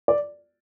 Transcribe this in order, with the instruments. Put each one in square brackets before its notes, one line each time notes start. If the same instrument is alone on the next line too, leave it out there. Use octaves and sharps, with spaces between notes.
[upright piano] D5